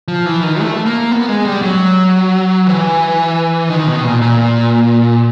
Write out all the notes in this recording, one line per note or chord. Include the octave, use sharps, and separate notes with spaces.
F3
E3
D#3
A3
A#3
B3
G#3
G3
F#3
E3
D#3
B2
A#2
A#2